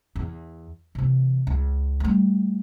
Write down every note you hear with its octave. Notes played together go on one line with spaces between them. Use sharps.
E2
C3 E3
C#2
G3 A3